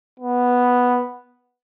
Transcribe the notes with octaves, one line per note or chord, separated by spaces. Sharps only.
B3